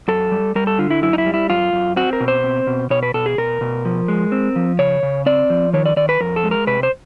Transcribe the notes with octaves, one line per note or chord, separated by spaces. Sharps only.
F#2 A4
G3
G3 A#4
A4
D3 F4
E4
F#2 E4
D#4
E4
G3
E4
F#2 F4
F#2
C4 F#4
A#4
B2
C5
C4
B2
B2 C#5
B4
B2 A4
G#4
B2 A#4
B2
F3
G#3
C4
F3
C#3 C#5
C#3
C4 D5
F3
D#3 C#5
D5
D#3 D5
B4
F2 A#4
A4
G#3
A#4
C3 B4
C5